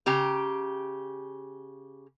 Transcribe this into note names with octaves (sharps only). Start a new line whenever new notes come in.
C#3 G4 A#5